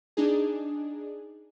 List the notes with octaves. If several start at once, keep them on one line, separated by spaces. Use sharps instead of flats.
D4 D#4 G#4